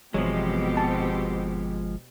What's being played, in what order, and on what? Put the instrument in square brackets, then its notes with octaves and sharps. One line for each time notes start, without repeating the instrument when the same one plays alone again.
[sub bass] G1 [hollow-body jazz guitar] E2 F#3 [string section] B2 C4 G4 [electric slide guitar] F3 G#3
[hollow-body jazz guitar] A5